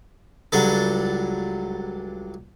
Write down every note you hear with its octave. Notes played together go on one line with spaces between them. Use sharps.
C#2 F#3 G3 D4 A4